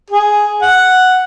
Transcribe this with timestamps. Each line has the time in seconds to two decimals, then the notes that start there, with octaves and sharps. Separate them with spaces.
0.10 G#4
0.62 F#5